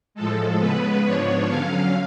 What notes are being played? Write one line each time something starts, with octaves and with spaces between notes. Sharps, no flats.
A2 F3 G#3 A4
C#3 G#3 B3 B4
G#2 F3 B3 D4 C#5
D3 F#3 C#4 F5